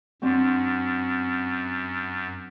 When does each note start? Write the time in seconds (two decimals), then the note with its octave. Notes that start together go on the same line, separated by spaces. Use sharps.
0.22 F#2 F#3 C4 D4